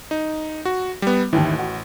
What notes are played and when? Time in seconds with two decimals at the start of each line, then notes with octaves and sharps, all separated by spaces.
0.11 D#4
0.65 F#4
1.02 G3 B3
1.33 A1 D#2 D#3 E3
1.59 F#4